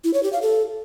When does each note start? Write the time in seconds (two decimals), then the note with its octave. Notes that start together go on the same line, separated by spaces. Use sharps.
0.04 E4
0.14 C#5
0.23 G4
0.33 F5
0.42 A4